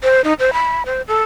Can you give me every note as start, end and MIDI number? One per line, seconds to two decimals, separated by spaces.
0.03 0.21 72
0.24 0.33 63
0.39 0.53 72
0.53 0.83 83
0.86 1.02 72
1.08 1.23 69